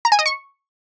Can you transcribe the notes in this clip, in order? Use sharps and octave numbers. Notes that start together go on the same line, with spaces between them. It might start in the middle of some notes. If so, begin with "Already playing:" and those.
A#5
G#5
D#5
C#6